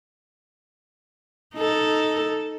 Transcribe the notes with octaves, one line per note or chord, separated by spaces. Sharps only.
D#4 A4